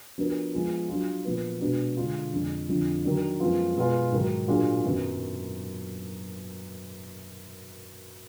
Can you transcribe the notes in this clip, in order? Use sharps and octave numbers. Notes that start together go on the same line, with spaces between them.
F3 B3 D4 F#4 A#4
F3 G#3 B3 F4
F#3 D4 F4
A#2 F3 B3
B2 G#3 B3 D4 F#4
D3 G#3 D4 F4
F2 D3 G#3
F2 D3 F3
D#3 F#3 D4
F#2 F3 G#3 B3 F4
B2 G#3 B3 F4
G#2 D#3 F#3
A#2 F#3 D4 F4 G#4
F#2 D#3 F#3 B3